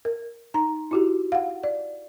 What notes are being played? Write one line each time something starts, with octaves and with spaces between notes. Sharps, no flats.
A#4
D#4 A#5
E4 F#4 G4
F5 F#5
D5